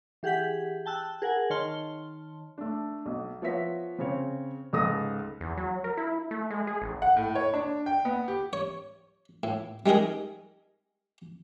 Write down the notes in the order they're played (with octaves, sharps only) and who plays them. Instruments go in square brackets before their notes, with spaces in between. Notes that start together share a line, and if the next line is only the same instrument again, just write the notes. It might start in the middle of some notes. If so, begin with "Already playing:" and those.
[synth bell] E3 G4 G#4 F#5 G6 B6
G5 A5 E6 F#6
G#4 A#4 F#5 G#5
D#3 C#5 A5 C6 F6 G7
[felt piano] A3 D4
B1
F3 B3 C#5 E5 B6
C#3 C4 C#5
C#2 G#2 A4 D#6 A#6
[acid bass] E2
F#3
A#4
E4
A3
G#3
G#4
A1
[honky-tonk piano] F#5
A2
C#5
D4
G5
B3
G4
[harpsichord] C#5
A2
G3 G#3 D#4 G#4 A#4